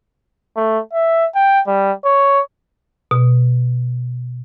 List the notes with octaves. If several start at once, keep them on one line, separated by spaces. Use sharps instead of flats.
A3
E5
G5
G3
C#5
B2